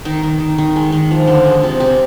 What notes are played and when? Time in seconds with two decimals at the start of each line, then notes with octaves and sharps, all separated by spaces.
0.05 D#3 D#4
0.23 D#3
0.40 D#3
0.58 D#3
0.76 G#3
0.92 D#3
1.11 F3
1.27 D3
1.46 G#3
1.63 C3 F4
1.80 C3 G4